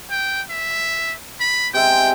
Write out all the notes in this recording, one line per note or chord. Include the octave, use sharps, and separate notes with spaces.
G5
E5
B5
C3 G#3 E5 G5